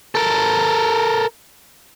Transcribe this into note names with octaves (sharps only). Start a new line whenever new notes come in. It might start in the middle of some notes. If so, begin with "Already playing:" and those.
A4 A#4